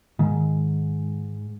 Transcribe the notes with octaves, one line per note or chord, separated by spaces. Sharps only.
G#2 D#3